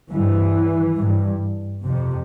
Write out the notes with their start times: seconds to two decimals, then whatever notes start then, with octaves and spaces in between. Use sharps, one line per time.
0.10 G2 E3
0.97 G2
1.83 F2 C3